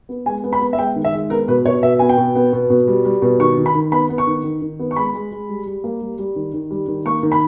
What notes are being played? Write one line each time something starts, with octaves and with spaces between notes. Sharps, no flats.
B3
G#3 G#5
B3
B5
B3
E5
G#3 G5
D#3
E5
G#3
B3 A#4
B2 B4
B2 C#5
B2 E5
B3 G#5
G5
B2
B3
B2
B2
G3
G3
B2
D#3 C#6
D#3
B5
D#3
B3 B5
B3
C#6
D#3
D#3
D#3
B3
C#6
G#3 B5
G#3
G#3
G3
G3
A#3
G3
G3
D#3
D#3
G3
D#3
A#3 C#6
D#3
B5